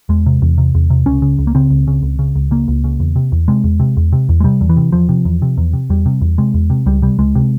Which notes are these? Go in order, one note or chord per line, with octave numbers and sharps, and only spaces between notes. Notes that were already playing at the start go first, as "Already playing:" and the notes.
E2 G#3
C3
E2
C3
E2
C3
C#2 C#4
C#3
C#2
A#3
C#3 C4
C#2
C#3
C#2
C#3
C#2
C#3 A#3
C#2
C#3
E2
C3
E2
C3 G#3
E2
C3
E2
C3
E2
G#3
C3 G3
E2
E3
C3
E2 F3
C3
E2
C3
E2
C3
E2 G3
C3
E2
C3 G#3
E2
C3
C#2 G3
C3 G3
C#2 G#3
C3